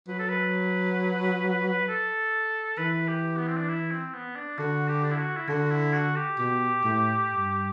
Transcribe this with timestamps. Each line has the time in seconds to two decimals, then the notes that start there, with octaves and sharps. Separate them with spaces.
0.08 F#3 B4
0.19 A4
0.29 B4
1.88 A4
2.78 E3 B4
3.08 G4
3.37 B3
3.47 C4
3.57 D4
3.68 E4
3.91 C4
4.14 B3
4.36 D4
4.58 D3 F#4
4.88 G4
5.04 D4
5.11 E4
5.19 F#4
5.37 E4
5.48 D3 F#4
5.71 E4
5.94 F#4
6.16 G4
6.38 B2 G4
6.84 A2
7.29 G2